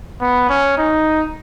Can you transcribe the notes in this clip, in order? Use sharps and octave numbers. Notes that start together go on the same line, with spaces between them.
B3
C#4
D#4